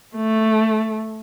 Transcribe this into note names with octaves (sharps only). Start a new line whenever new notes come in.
A3